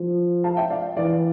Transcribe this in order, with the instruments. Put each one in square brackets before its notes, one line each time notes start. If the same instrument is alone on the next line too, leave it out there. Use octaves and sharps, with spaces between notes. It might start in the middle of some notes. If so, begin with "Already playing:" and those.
Already playing: [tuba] F3
[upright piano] F5 A5
E5 G5
D5 F5
[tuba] E3 [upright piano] D5 F5